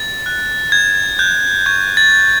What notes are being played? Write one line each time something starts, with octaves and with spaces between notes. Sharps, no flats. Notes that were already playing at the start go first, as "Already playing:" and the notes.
Already playing: A6
F#6
F#6 G#6
F#6 G6
C#6 G#6
A6
F#6